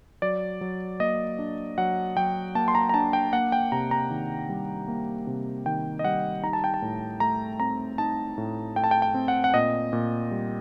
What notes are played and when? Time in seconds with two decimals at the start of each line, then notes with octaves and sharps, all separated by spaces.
0.22 F#3 D5
0.61 F#3
1.00 A#3 D#5
1.39 D4
1.78 F#3 F#5
2.17 F#3 G5
2.55 A#3 A5
2.68 C6
2.75 A#5
2.89 A#5
2.94 D4 A5
3.13 G5
3.33 A#3 F#5
3.52 G5
3.72 C3 A#5
3.91 A#5
4.10 D#3
4.49 G3
4.88 A#3
5.27 C3
5.66 D#3 G5
5.99 D#5
6.04 G3 F#5
6.43 D#4 A#5
6.53 A5
6.64 G5
6.74 A5
6.82 A2
7.20 A3 A#5
7.60 C4 A#5
7.98 D#4 A5
8.38 A2
8.76 A3 G5
8.84 A5
8.91 G5
9.02 G5
9.14 C4
9.28 F#5
9.44 F#5
9.54 A#2 D#5
9.93 A#2
10.31 G3